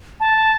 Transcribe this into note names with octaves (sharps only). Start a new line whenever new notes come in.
A5